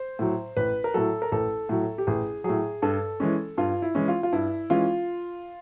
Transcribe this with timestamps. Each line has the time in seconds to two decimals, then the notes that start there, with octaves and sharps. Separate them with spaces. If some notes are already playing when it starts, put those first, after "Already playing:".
Already playing: C5
0.19 A2 F#3
0.56 A1 B4
0.84 A#4
0.94 A2 F#3 A4
1.22 A#4
1.32 A1 A4
1.69 A2 F#3
1.98 G4
2.07 A1 G#4
2.44 A2 F#3 G#4
2.82 G2 A4
3.20 E3 G#3 C#4
3.58 G2 F4
3.82 E4
3.95 E3 G#3 C#4
4.08 F4
4.23 F4
4.32 G2 E4
4.70 E3 G#3 C#4 F4